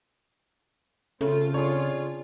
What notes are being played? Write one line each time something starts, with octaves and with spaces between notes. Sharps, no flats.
C#3 A3 C4 F4
D4 F4 G#4 C#5